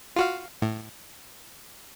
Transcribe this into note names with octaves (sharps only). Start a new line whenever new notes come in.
F4 F#4 F5
A2